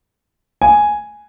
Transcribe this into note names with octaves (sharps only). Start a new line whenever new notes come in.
G#5